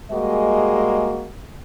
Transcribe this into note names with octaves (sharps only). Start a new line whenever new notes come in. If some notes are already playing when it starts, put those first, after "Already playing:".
G3 G#3 A#3 F#4 G#4 D#5